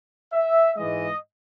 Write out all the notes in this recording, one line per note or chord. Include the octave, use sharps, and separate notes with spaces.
E5
G#2 E3 G#3 D#5